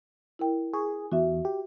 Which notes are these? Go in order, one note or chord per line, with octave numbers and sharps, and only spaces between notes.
E4 A#4 G5
G#4 C#6
E2 F#4 E5
G4